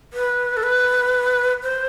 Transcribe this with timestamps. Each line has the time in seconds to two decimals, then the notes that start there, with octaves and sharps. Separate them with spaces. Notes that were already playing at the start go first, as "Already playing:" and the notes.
0.13 B4
0.57 A4
0.63 B4
1.63 C5